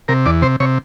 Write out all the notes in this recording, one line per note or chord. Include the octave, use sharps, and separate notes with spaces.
C3 A#4
E2 D5
C3 C5
C3 C#5